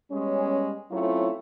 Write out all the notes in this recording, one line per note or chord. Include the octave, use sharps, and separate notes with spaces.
G3 G#3 B3 C#4
F#3 A3 C4 C#4 E4 F4